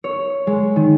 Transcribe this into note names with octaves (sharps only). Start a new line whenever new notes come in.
C#5
G#3
D#3